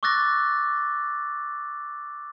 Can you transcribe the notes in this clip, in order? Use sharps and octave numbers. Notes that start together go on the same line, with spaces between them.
C#6 D6 E6 F#6 A6 A#6